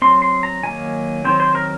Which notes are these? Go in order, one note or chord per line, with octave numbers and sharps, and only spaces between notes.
F#3 C4 C6
C6
A#5
D#3 F#3 A#3 G#5
D#3 F#3 C4 C5
C5
A#4